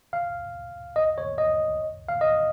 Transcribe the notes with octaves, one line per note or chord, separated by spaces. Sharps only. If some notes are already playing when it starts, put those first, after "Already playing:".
F5
D#5
C#5
D#5
F5
D#5